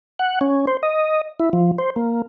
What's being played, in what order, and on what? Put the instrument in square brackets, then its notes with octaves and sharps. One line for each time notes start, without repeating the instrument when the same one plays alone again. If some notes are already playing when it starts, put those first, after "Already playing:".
[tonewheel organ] F#5
C#4
C5
D#5
E4
F3
C5
A#3